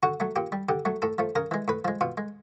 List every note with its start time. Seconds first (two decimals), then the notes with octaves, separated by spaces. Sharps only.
0.03 D3 F#4
0.20 F#3 A3
0.36 A#2 G4
0.52 G3
0.69 D3 G4
0.85 F#3 A3
1.02 A2 A4
1.18 F3 A3
1.36 C#3 A#4
1.51 E3 G#3
1.68 A2 B4
1.85 F3 G#3
2.01 B2 F4
2.18 G#3